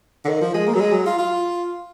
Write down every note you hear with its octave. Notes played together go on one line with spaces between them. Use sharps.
D3
D#3
F3
G#3
A#3
F#3
G#3
F#3
F4
F4